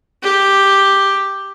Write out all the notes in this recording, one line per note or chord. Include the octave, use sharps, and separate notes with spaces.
G4